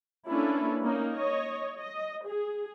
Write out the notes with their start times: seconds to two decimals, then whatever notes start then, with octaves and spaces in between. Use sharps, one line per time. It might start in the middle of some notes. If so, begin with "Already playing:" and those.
0.29 A#3 C#4 D4 E4 A4 B4
0.83 A#3 C#4 D#4
1.13 C#5 D#5
1.78 D#5
2.26 G#4